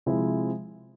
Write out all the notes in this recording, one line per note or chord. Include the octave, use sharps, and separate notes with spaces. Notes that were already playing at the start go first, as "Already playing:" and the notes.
C3 F3 G#3 C4 E4